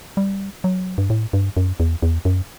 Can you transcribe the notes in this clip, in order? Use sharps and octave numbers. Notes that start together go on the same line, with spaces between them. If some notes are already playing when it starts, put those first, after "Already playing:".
G3
F#3
G2
A2
G2
F#2
E2
E2
F#2